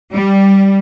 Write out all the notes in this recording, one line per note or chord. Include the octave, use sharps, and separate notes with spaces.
G3